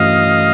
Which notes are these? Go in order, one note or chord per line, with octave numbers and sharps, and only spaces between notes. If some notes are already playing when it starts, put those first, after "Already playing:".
Already playing: G2 E3 A3 C#4 F#4 D#5 F5